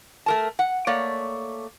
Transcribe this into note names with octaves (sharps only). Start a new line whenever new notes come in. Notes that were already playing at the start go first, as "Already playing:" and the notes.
A3 A#4 A5
F#5
A3 A#3 C#5 D5